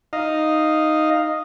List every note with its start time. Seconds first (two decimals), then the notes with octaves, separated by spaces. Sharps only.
0.13 D#4 D#5 F5